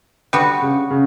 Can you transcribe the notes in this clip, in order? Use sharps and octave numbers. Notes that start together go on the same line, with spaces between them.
D3 G3 B3 F#4
C#3
C#3